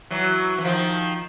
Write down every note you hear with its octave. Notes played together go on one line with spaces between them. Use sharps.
E3 F#3
E3
D#3 F3